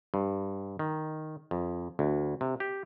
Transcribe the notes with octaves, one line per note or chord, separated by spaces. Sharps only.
G2
D#3
F2
D2
C3
G4